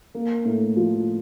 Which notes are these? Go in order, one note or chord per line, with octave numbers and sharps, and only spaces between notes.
A#3
A2
F3